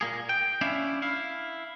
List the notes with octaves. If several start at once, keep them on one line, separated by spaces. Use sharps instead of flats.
A#2 A#3 G#4
G5
C#4 D4 E4 E5 F5
E4 F5